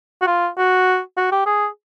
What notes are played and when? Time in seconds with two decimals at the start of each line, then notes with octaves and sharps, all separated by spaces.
0.22 F#4
0.27 F4
0.58 F#4
1.17 F#4
1.32 G4
1.46 G#4